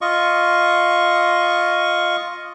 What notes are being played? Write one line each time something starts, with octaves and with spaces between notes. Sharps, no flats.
F4 D#5 C#6